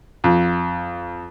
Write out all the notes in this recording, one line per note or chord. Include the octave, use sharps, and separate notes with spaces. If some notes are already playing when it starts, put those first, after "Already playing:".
F2